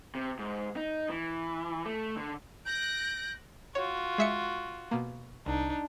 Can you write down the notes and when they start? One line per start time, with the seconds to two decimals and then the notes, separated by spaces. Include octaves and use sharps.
0.15 C3
0.39 G#2
0.76 D#4
1.10 E3
1.85 A3
2.17 D3
2.66 F#6 G6 A#6 D7
3.75 F4 F#4 C#5
4.18 G#3 E5 C#7
4.91 B2 A#3
5.46 C2 D4 D#4